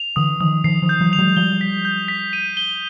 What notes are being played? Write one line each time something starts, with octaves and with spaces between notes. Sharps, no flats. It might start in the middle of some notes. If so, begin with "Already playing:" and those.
Already playing: F7
D3 E3 D#6
D#3 F3 D#6
D#3 F3 C7
D#3 F3
G6
E3 F#3
F7
F#3 G#3
F3 G3 G7
B6
G6
B6
D#7
G7